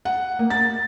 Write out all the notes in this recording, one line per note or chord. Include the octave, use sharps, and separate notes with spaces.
F#5
A#3
A6